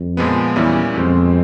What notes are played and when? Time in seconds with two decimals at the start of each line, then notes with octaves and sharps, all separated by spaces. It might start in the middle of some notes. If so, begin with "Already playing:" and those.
Already playing: F2
0.17 A#2 F3 G#3 B3
0.56 E2 A#2 G3 A#3 C#4 E4
0.94 F2 B2 G#3 C4